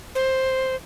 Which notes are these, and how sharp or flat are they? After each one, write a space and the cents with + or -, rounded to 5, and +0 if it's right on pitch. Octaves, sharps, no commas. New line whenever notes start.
C5 +5